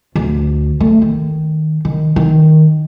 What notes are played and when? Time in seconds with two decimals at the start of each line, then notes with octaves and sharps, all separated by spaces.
0.15 D2
0.80 A3
1.02 D#3
1.85 D#3
2.16 D#3